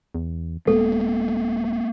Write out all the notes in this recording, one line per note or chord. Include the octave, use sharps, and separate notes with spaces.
E2
D#1 G#3 A#3 B3 A4